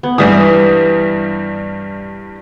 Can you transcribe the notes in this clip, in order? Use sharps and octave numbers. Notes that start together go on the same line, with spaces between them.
B3
G2 E3 G3 D#6